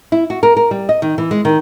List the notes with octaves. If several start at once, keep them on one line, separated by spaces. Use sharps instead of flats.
E4
F#4
A#4
A#4
G3
D#5
D#3
E3
G#3
D#3